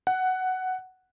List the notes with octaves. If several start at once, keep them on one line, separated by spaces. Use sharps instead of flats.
F#5